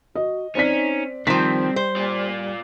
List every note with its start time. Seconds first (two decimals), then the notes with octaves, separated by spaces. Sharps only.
0.15 F#4 D#5
0.55 C4 C#4 D#4 D5 B6
1.27 D#3 F3 G3 C4 B6
1.76 C5
1.96 F4 D5